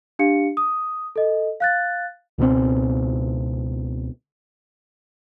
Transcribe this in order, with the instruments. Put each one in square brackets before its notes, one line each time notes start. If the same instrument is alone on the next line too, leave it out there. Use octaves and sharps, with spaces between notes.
[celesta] D4 G4 F5 C#7
D#6
A4 D#5
F5 F#6 A6
[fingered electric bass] C#2 B2 F3 C4